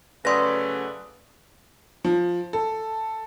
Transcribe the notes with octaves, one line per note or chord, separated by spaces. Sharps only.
C#3 F#3 A3 B4 D5 C6 D#6 A#6
F3
A4